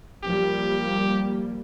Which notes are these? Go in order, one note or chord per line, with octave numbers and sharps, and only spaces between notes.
F3 G3 A#3 G4